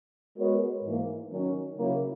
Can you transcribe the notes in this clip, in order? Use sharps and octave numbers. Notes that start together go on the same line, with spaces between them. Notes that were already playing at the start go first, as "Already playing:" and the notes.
G#3 B3 F#4 A#4 C#5
G#2 E3 A#3
D#3 F#3 C#4
C#3 F#3 A#3 E4